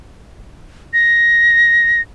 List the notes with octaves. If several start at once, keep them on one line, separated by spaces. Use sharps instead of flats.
A#6